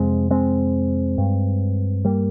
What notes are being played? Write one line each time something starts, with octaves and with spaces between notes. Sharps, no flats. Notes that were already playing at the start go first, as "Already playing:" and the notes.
Already playing: F2 C3 G#3 C4
G#3 C4
G2
G3 A#3